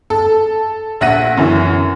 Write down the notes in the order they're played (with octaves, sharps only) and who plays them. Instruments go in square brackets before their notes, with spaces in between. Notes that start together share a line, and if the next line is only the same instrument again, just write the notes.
[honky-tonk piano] A4
A#1 E5 F#5 A#6 D#7
F#2 E3